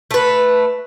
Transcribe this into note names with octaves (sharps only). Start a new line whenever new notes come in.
A3 B4